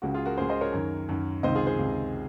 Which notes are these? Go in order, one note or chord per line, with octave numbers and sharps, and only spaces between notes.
C#2 C#3 F#4
F4 G#4
F#4 A#4
C#2 C#3 G#4 C5
C5 D#5
A#4 C#5
F#2 D#3
F#2 D#3
C#2 C3 D#3 C5 D#5
F4 G#4
G#4 C5
C#2 C3 D#3